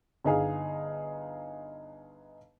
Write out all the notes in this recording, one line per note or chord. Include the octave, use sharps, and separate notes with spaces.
G1 D#4 G#4 F5